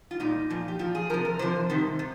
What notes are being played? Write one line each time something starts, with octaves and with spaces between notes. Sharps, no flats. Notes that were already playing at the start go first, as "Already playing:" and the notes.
F4
A#2 G3 D#4
A#2 F3
G4
A#2 F3 F4
G#4
C3 F3 A#4
A#4
C3 F3 C5
C3 D#3 G3
C3